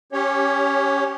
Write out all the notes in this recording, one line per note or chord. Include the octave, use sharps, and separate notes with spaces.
C#4 G4 C#5